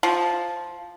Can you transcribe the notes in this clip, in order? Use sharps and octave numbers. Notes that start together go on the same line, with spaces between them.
F3